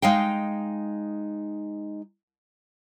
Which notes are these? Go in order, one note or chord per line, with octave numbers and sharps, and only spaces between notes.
G#3 D#4 F5 G5